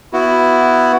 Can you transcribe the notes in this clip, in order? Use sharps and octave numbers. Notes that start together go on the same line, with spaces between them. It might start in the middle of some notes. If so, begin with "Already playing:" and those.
B3 E4 F#4